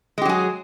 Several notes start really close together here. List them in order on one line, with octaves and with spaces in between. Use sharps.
G#3 G4 F#3 G#4